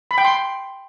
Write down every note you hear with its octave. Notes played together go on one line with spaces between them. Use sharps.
B5
G5
C6